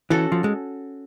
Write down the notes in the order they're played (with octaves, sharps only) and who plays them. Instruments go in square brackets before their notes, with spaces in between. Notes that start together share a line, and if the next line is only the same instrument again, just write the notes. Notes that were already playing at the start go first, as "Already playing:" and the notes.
[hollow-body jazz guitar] E3 [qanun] C#4 F#4 A4
[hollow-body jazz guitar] F3
G#3